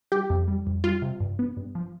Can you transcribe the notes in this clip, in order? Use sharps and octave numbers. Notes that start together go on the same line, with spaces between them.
G3 G4
F2
G3
F2
G3 F4
C3
G2
B3
G2
F3